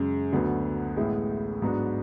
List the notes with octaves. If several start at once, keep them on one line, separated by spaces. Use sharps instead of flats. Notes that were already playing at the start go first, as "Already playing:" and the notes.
Already playing: F#2 C#3 G#3
D2 D3 F#3 B3
A1 A2 G#3 B3 E4
G#2 F#3 B3 D4 F#4